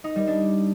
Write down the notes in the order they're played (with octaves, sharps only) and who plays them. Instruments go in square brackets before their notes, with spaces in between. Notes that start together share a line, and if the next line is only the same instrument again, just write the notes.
[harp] D#4
G3
D4